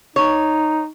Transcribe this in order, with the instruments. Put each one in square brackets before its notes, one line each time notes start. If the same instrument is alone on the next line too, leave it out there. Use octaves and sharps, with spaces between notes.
[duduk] D#4 [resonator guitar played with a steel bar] C#5